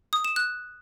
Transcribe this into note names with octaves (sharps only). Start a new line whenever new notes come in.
D#6
E7
F#6